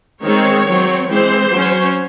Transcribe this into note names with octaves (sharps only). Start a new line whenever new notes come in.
D#3 G#3 C4 C#5
F#3 C4
E3 G#3 C4 C5
F#3 C#4